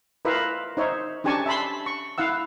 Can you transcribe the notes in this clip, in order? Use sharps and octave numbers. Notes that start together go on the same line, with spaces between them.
E4 F4 A#4 B4 E5 F5
D#4 C5 C#5 E5
C#4 D4 G4 G#5 A5 C#6
E5 A5 B5 C6
C#6
E4 F5 F#5 E6